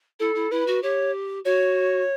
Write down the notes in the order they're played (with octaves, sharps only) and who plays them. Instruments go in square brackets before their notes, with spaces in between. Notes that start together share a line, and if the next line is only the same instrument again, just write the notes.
[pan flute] E4 [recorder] A4
[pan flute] E4
[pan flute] E4 [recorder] B4
[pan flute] F#4
[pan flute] G4 [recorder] C#5
[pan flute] F#4 [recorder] C#5